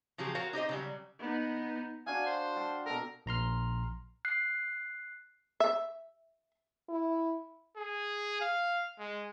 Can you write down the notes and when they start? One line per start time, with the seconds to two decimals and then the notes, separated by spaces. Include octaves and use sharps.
0.18 C#3 F3 F#3 G4 G#4
0.35 F#4 A#4 C#5 F5
0.53 D#4 G4 C5 D#5
0.69 C#3 F#3 G3
1.19 B3 D#4
2.07 D4 F#4 F5 G#5
2.26 C5
2.56 G5 A5 C6
2.86 B2 A4 A#4
3.26 A#1 A#5 C6 F6
4.25 F#6 C7
5.60 E5
6.89 E4
7.77 G#4
8.41 F5
8.99 G#3